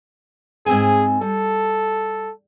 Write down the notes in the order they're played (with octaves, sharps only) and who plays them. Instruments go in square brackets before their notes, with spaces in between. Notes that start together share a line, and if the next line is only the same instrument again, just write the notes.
[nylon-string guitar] G#2 C4 G#5 [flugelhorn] G#4
[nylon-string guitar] G3 [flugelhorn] A4